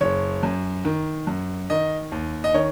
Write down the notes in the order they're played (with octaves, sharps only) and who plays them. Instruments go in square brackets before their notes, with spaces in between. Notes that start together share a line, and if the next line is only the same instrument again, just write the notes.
[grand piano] F#1 C#5
F#2
D#3
F#2
D#3 D#5
D#2
D#5
D#3 C#5